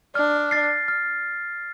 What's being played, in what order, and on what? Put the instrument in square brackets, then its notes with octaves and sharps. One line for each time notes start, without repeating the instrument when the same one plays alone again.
[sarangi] D4 [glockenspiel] F6
[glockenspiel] A6 C7
F6